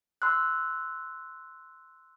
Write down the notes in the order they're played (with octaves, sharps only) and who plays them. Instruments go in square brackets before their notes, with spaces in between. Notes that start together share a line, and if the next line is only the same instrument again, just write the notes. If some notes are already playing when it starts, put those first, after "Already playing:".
[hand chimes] C6 E6 F#6